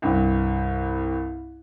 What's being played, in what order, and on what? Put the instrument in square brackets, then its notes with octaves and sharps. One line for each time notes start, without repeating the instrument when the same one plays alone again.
[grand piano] C2 G2